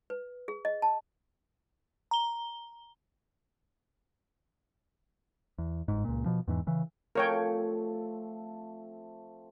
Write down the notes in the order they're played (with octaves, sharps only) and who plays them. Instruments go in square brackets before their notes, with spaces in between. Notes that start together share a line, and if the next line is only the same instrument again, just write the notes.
[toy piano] B4
G#4
D#5
A5
[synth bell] A#5 G7
[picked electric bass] E2
G1 G#2
C#2 A#2
B2 F3
E2 G#2 E3
C#3 E3
[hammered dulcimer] F3 A3 C4 [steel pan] A#4 C#5 G5